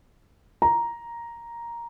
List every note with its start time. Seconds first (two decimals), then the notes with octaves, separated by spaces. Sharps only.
0.62 A#5